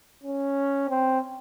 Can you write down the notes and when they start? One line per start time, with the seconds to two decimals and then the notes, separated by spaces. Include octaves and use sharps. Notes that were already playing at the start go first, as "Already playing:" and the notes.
0.23 C#4
0.90 C4